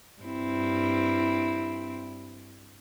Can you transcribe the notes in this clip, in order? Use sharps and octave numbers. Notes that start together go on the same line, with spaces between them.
G2 C4 E4